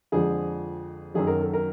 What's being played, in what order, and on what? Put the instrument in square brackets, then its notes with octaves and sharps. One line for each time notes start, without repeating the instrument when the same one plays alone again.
[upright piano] F2 D3 F3 G#3 G#4
F#2 D#3 F#3 G#4
A#4
A4
A#4